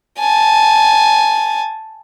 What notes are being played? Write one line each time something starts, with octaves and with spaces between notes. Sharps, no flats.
G#5 A5